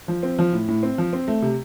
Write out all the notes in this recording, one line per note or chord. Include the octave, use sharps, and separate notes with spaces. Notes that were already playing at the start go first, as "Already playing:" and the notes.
F3
C4
F3
A2
A2
C4
F3
C4
A3
C3